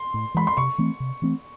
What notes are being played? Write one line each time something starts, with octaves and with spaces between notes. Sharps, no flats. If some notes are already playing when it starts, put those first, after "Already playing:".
Already playing: C6
A2
E3 G#3 B5
C6
C3 C#6
E3 A3 C4
C3
E3 A3 C4